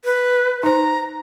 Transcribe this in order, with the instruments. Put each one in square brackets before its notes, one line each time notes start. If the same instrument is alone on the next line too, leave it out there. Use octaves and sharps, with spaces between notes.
[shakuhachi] B4
[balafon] D#4 C5 [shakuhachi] A#5